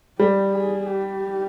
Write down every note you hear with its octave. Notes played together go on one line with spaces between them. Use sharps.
G3 G4
G#4
G4